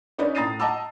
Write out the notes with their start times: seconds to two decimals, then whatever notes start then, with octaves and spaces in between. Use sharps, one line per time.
0.18 C#4 D#4 B4 C#5 D5
0.35 A2 A#5 D#6 A6 C7 D#7
0.60 D#5 F#5 A5 A#5 D6 E6